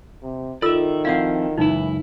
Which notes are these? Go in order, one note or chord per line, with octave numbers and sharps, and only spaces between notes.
C3
D#3 F4 A4 D5 E5 E6
F3 C4 E4 F5 F#5
C#2 F#2 E3 D#4 E4